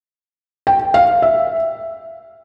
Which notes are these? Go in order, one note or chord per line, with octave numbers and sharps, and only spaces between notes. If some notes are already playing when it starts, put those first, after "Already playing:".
G5
F5
E5